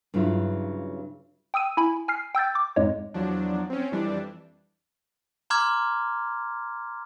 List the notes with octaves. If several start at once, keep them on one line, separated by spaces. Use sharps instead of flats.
G2 C#3 F#3 E4 F4
G5 D#6 E6 D#7
E4 G#5 B5
G#5 F6 C7
G5 E6 G6 A6
D6
F2 G#2 G#3 C#5
E2 F3 F#3 D4
C4 C#4
F2 E3 G3 D4
A#5 C6 D6 F6 G#6